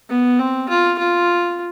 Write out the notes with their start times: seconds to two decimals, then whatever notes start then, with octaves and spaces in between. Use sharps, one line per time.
0.09 B3
0.39 C4
0.69 F4
0.98 F4